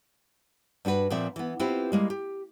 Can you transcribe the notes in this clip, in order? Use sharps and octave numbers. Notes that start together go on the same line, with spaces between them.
G2 D4 F#4 B4
A#2 F3 C4 E5
E3 B3
C4 E4 F4 G4 B4 C5
G3 G#3 A#3
G4